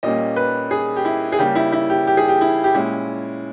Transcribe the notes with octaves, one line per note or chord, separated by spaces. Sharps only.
A#2 G3 A#3 C#4 D#5
B4
G#4
G4
E4
G#4
C#3 G3 A#3 C#4 G4
E4
E4
G4
G4
G#4
G4
E4
G4
A#2 G#3 C#4 E4